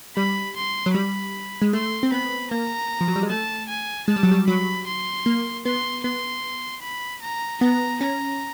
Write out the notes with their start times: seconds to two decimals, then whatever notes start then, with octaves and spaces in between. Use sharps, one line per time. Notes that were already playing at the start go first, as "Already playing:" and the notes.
0.16 G3 B5
0.56 C6
0.86 F#3
0.94 G3 B5
1.62 G#3
1.73 A3 C6
2.03 C4
2.12 B3 B5
2.51 A#3 A#5
3.01 F3
3.08 F#3
3.16 G3
3.23 G#3
3.30 A3 A5
3.68 G#5
4.08 G#3 A5
4.16 G3
4.23 F#3
4.31 G3
4.47 F#3 B5
4.87 C6
5.26 A#3
5.65 B3 C6
6.04 B3 C6
6.82 B5
7.21 A#5
7.61 B3 A#5
8.01 C#4 A#5